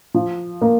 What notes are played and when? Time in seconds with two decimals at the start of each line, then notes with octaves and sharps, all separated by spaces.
0.14 F3
0.62 A#3